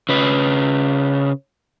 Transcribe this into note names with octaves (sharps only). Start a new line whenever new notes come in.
C#3 B4